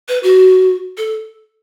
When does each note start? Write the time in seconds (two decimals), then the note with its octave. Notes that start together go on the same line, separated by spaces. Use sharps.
0.08 B4
0.23 F#4
0.97 A4